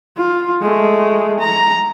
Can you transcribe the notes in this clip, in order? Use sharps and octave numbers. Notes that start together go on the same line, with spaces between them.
F4
G#3 A3
A#5